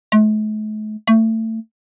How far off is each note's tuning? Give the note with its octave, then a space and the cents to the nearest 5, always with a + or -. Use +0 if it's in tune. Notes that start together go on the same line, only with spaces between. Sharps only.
A3 -45
A3 +25